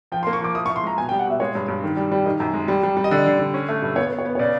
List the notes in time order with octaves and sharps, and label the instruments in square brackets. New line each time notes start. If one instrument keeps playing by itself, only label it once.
[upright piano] F3 [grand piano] G5
[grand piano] C6
[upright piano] A#3
[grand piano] C#6
[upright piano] F3 [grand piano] D6
[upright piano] E4 [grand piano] D#6
[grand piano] C#6
[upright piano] E4
[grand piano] C6
[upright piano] G#3 [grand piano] A#5
[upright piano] B2 [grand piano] G#5
[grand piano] G5
[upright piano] G3
[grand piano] F#5
[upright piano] B2 [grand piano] E5
[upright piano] G#3 [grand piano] C#5
[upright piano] G2
G2
D#3
G3
G3
[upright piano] D#3 [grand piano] D#5
[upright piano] F#2
G#3
G3
G3
G3
[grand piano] D#5
[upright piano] D3 [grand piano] D5
[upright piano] D3
D3
C#4
A3
G2
[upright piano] B3 [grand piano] C#5
[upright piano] B3
[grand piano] C#5
[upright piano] B3
[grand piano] C#5
[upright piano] C#3 [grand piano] D5